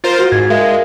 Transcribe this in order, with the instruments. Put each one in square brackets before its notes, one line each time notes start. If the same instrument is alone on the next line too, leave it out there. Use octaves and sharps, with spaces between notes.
[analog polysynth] F4 A#4 C5 [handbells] A6
[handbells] F#4
[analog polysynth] G#2 [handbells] G#6
[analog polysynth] G#3 [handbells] A#4 E5 F5